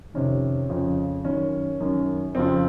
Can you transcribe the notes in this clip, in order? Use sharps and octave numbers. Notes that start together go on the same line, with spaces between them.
F2 C3 D#3 C#4
F2 C#3 F3
F#2 D#3 C#4
F#2 D#3
F2 C#3 F3 C4